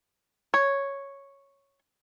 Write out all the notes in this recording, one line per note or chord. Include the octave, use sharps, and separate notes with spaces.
C#5